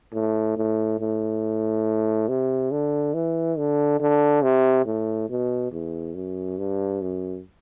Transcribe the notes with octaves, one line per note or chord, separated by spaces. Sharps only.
A2
A2
A2
C3
D3
E3
D3
D3
C3
A2
B2
E2
F#2
G2
F#2